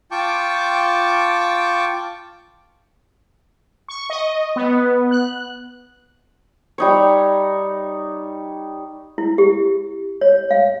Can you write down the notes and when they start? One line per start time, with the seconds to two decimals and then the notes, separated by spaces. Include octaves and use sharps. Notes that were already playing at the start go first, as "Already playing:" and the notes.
0.11 F4 G5 A5 C#6 D6
3.88 C#6
4.10 D#5
4.56 B3
5.11 F#6
6.78 G3 D#4 C#5
9.18 E4
9.38 G4
10.21 C#5
10.51 F5